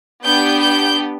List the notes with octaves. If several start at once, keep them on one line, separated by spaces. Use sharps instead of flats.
B3 D4 G4 G6
G6